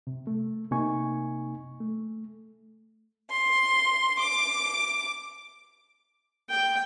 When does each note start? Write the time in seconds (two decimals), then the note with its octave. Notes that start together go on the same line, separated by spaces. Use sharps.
0.07 C3
0.27 A3
0.71 C3 A#3 D#4 G#5 C#6
1.80 A3
3.31 C6
4.19 D6
6.50 G5